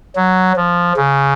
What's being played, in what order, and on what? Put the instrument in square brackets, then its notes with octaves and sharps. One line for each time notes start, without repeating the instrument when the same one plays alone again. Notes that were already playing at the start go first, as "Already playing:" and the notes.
[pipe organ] F#3
F3
C#3